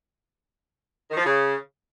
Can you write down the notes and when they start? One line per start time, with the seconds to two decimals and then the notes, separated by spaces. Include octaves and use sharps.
1.09 D#3
1.17 F3
1.25 C#3